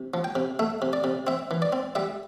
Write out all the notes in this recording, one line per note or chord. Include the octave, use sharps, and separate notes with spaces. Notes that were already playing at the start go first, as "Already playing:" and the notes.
Already playing: C3
F3
G5
C3
A3 E5
C3
D5
C3
C4 E5
E3
D5
C4
G3 E5